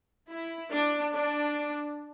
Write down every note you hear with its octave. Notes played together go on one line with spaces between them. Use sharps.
E4
D4
D4